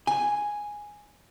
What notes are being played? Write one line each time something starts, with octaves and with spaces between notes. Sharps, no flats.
G#5